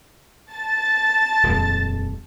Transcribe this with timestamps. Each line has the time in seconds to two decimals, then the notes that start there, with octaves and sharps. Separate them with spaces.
0.50 A5 A6
1.43 D#1 F2 G#3